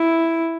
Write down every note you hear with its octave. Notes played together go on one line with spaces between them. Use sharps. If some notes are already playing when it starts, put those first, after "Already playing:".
Already playing: E4